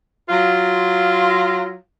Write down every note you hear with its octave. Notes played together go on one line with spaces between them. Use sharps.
F#3 F4